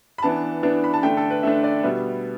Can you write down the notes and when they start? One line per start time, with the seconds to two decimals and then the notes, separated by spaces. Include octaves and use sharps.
0.18 B5
0.22 E3 B3 D4 A5
0.63 E3 B3 D4
0.84 B5
0.94 A5
1.03 D3 A3 D4 G5
1.17 A4
1.31 B4
1.43 D3 A3 D4 E5
1.64 D5
1.83 B2 G3 B3 E5